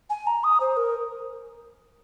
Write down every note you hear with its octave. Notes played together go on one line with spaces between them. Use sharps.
G#5
A#5
D#6
C5
A#4